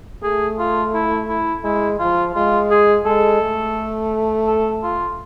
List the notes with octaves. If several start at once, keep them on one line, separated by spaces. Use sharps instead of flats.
A3 G#4
F4
E4
E4
G#3 E4
F3 F4
G#3 F4
G#4
G#3 A4
A3
A4
F4